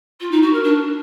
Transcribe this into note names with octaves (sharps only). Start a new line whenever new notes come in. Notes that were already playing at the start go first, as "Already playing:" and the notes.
F4
D#4
F#4
A#4
D4